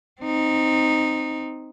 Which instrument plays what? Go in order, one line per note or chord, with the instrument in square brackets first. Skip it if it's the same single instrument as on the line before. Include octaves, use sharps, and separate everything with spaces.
[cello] C4 D#4